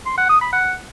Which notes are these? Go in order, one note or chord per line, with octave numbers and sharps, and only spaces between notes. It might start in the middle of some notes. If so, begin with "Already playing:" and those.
C6
F#5
D#6
B5
F#5